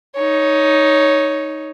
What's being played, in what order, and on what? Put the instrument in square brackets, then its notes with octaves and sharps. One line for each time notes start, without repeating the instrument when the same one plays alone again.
[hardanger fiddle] D#4 C#5